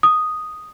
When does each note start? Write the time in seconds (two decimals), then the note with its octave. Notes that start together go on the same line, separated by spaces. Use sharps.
0.03 D#6